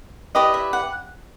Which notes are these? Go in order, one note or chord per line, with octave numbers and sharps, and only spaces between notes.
E4 G4 B4 D5 D#5
E5
F#5